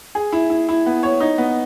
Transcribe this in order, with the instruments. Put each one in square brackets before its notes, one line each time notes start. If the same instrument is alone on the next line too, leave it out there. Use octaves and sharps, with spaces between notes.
[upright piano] G#4
E4
E4
E4
B3
C#5
D#4
B3